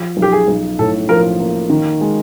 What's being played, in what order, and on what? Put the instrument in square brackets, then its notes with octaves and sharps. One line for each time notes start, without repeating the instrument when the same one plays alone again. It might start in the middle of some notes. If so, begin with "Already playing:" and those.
Already playing: [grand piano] F3
B1
[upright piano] G4
G#4
[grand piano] B1
[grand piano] A2 [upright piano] A4
[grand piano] F3 [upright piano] A#4
[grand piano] A#3
D#3
G#3